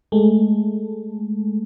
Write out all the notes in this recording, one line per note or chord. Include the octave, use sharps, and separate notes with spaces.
G#3 A3